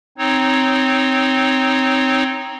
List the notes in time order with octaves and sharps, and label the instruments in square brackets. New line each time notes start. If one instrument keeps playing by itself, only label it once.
[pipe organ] C4 D#4 C#5